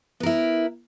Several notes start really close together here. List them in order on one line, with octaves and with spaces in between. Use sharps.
B3 A#4 E4